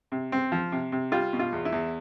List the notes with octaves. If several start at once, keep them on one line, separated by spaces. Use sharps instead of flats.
C3
C4
F3
C3
C3
G3 F4
B2
F4
E2
E4
E2